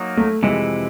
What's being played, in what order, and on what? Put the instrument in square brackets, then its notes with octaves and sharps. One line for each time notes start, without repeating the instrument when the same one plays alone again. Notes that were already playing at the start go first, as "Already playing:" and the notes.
Already playing: [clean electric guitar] F#3 A#3 D#4
[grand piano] A3
[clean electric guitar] F2 C3 E3 [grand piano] G#3